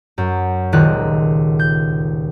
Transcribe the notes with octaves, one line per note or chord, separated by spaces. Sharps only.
F#2
D#1 C#2 D#3 F4 F#6
G6